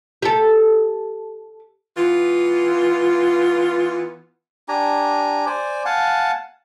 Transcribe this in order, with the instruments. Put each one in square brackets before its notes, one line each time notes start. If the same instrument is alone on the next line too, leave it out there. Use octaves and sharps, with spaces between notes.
[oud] G4 A4
[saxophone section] E3 B3 F4
[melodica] D4 G4 G#5 A#5
C5 D5 G#5
F5 F#5 G#5 A5